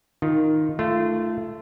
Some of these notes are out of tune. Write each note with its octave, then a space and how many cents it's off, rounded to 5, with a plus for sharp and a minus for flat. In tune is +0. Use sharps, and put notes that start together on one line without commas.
D#3 +0 F4 +0
A3 +0 F4 -25